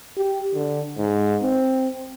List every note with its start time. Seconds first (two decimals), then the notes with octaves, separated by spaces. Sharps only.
0.17 G4
0.54 D3
0.98 G#2
1.42 C4